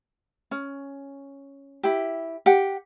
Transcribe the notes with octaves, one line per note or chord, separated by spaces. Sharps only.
C#4
E4 G4
G4 F#5